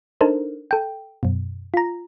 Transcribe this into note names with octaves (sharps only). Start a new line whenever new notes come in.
D4 D#4 A4 A#4 C5
A4 G5
F#2 B2
F4 A#5